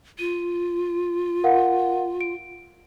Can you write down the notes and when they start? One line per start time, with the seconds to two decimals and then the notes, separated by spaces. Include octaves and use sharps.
0.19 F4 D#7
1.44 A#4 F5 F#5
2.21 D7